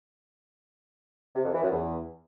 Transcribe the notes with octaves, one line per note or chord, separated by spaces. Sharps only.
C3
F2
E3
F#2
E2